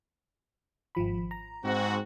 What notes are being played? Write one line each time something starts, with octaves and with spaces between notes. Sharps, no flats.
G#1 F3 B5
A#5
G#2 C4 F#4